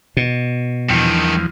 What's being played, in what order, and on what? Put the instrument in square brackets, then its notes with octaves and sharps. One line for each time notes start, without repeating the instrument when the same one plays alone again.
[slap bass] B2
[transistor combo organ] E2 F3 [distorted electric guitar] G2 D#3